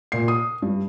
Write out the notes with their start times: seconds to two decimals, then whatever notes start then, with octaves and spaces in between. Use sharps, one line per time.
0.12 A#2 C7
0.28 D#6
0.62 G2